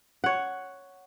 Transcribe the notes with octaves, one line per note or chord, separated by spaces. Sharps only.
C#5 F#5